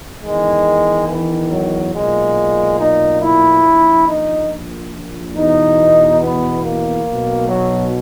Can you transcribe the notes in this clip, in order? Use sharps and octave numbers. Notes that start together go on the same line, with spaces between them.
E2 D#3 G#3
E3
F#3
B1 A#2 G#3
D#4
E4
A#1 A#2
D#4
E2 B2 D#4
B3
A#3
B1 B2
F#3